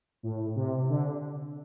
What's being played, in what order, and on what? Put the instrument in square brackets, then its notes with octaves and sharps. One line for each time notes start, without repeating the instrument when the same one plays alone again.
[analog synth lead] A2
C3
D3